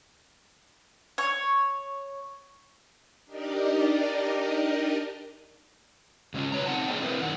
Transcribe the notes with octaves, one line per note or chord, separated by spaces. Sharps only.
C#5
D4 D#4 G4 A#4 D5 D#5
C#3 G#3 C4 C#4 F4
B4 C#5 A#5
B3 C4 D#4 F#5 A5
A#3 G#4 C5 D#5 G5
C4 E4 G#4 A#4 B4
F#2 D#3 F#5